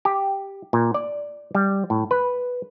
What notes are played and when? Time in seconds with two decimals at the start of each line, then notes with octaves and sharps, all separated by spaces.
0.05 G4
0.73 A#2
0.94 D5
1.55 G3
1.90 A2
2.11 B4